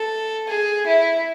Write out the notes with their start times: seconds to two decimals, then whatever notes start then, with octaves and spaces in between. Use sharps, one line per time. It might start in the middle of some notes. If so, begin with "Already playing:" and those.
Already playing: A4
0.48 G#4
0.86 E4